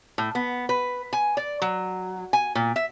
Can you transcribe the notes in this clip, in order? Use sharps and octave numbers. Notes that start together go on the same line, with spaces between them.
A2
B3
B4
G#5
D5
F#3
G#5
A#2
E5